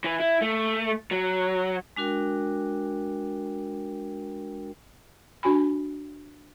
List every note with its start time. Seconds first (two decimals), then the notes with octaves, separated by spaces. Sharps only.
0.04 E3
0.20 E4
0.42 A3
1.11 F#3
1.96 G#3 D4 F#4 A#4 G5
5.43 D4 F#4 G#5 B5